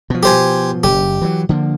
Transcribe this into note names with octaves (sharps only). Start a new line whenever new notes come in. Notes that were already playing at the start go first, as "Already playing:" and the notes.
B2 F3
G4 C5 G#5
F#1 G4
E3 F#3
D3 F3 A#3